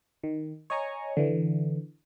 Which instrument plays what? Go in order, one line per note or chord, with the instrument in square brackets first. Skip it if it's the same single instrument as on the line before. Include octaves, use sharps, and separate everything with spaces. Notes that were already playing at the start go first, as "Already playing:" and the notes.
[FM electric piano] D#3
C#5 D#5 G#5 A#5 C#6
D3 E3